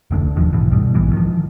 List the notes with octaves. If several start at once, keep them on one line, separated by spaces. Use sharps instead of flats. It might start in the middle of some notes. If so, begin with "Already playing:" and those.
F1 D2 D4
D#2 D#3 F3
B1 G#2 B2 E3
B2 G3
A#1 G#2 E3
D#3 F3